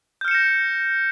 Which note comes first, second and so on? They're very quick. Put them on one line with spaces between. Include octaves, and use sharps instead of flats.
G6 F6 C#7 E7 A#6